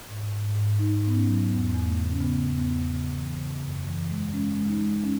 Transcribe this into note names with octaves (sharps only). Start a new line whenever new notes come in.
G#2
G#2
G#2
G#2 D#4
G#2 B3
C#4
F#3
E2 B3
E2
A3
C#3
C#4
C#3 B3
E2
B3
E2
C#3
E3
C#3
F#2
E3
G#3
G#3 C#4
G#3
D#4
G#3
C#4